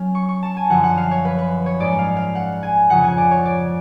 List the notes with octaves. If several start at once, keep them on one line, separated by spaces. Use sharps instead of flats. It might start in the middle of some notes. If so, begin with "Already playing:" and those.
Already playing: F#3 C#4 F6
C#6
C#6
A5
G#5
F#2 D3 F3 F#5
F#5
F5
C#5
B4
B4
C#5
G#2 G#3 C#4 D5
F5
F5
F#5
G#5
F2 C#3 F3 F#5
G#5
D5
C#5
D5